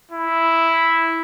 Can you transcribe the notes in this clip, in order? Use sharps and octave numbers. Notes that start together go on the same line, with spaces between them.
E4